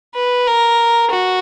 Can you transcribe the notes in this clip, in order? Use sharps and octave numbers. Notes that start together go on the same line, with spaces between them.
B4
A#4
F#4